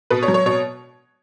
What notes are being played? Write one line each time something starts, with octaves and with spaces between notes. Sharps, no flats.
B2 B4
C#5
F#3
C#5
B2 C#5